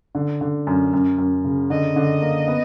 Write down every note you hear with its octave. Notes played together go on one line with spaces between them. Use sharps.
D3
D3
F#2
F#2
F#2
C#3
D3 D#5
D3
A#3
B3